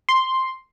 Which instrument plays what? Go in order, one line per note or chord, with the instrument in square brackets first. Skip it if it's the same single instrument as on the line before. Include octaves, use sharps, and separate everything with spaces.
[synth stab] C6